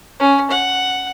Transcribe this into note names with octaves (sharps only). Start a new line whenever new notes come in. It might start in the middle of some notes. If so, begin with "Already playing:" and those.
C#4
F#5